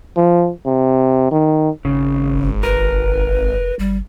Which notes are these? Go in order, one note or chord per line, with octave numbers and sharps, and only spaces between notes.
F3
C3
D#3
G#1 C#3
F1
A#4 B4
G1 G3